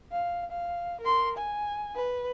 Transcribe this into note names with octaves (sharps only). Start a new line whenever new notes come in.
F5
F5
A#4 C6
G#5
B4